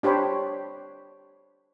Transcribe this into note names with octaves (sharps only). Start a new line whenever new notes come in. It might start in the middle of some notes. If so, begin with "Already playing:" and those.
D4 G4 C5 C#5 B5